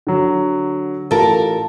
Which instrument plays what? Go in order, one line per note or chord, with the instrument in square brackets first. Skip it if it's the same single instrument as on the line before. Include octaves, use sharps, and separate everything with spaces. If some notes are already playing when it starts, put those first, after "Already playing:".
[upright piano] D3 F#3
[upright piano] A1 F4 [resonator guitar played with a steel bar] A4 A#4